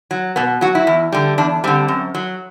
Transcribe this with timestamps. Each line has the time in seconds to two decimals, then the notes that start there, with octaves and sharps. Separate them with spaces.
0.11 F#3
0.36 B2 B3
0.61 F#3 F#4
0.75 E4
0.87 E2
1.12 D3 G3
1.38 E2 D4
1.64 D3 G3 C4
1.88 F#2
2.15 F#3